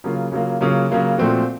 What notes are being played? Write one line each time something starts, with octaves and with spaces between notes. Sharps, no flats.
C#3 F#3 A#3 F4
C#3 F#3 A#3 F4
C#3 F#3 A#3 F4
C#3 F#3 A#3 F4
A#2 F3 A3 C4 F#4